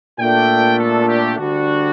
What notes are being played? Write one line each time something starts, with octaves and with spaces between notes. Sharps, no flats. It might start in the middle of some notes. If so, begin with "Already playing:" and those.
A#2 A3 D4 G5
A4
G4
D2 D3 G3 D4 F#4